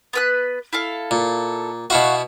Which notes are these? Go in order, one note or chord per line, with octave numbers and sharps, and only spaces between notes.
B3 B4 F#6
E4 A4 F5
A#2
B2 E4 F#4 F5 F#5 C#6